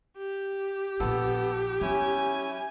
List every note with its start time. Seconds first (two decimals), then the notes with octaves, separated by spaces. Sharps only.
0.17 G4
1.00 A#1 B3 F4 A4 E6
1.81 F#3 B3 C#4 E4 G#5